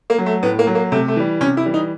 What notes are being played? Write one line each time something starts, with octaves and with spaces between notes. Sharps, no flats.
A#3
F#3
A3
A2 B3
A#3
F#3
A#3
C3 A3
A3
E3 G3
C3 C#4
E4
E3 G3
D#4